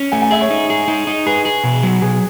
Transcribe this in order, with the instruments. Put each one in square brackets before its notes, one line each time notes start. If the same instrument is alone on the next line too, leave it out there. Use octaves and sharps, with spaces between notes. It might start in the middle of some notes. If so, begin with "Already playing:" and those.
Already playing: [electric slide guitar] C#4
[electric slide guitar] A3 [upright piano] G#5
[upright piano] G#5
[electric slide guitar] G#4 [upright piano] E5
[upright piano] C#5
[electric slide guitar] D#4
G#4
D#4
D#4
[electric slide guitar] G#4 [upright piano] B4
[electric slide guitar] G#4
B2
F#3
[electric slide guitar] B2 [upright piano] G#4